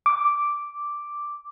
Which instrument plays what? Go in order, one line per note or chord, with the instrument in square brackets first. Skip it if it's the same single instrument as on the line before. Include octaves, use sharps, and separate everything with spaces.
[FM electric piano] D6